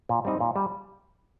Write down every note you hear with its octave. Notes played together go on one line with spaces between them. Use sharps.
A#2
G3 C4 D#4
A#2
G3